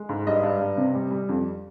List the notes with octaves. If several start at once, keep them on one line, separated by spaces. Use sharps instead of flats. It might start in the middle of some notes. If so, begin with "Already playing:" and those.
Already playing: G#3
G#2
G2 D#5
G2
G2
C3
G3
G3
F2